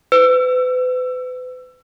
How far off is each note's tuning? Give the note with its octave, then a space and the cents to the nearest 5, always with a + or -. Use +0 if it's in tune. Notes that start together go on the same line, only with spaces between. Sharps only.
B4 +35 E6 +25